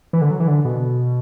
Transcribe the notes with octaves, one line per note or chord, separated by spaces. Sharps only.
E3
D3
F#3
E3
D3
B2